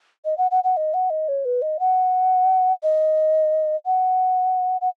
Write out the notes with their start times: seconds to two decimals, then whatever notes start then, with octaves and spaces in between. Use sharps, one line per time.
0.25 D#5
0.38 F#5
0.51 F#5
0.64 F#5
0.77 D#5
0.94 F#5
1.10 D#5
1.28 C#5
1.45 B4
1.62 D#5
1.80 F#5
2.83 D#5
3.86 F#5
4.81 F#5